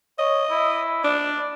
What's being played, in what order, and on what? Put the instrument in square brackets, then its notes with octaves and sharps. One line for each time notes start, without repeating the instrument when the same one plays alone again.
[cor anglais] C#5 [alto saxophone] D#5
[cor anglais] E4
[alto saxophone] D4 [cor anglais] D5